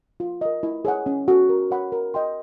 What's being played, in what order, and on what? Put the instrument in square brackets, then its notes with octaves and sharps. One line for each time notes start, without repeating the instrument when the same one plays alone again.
[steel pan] F4
A#4 D#5
E4
G#4 C#5 F#5
C#4
F#4 A4
A#4
C#5 F#5 B5
A#4
D#5 G5 C6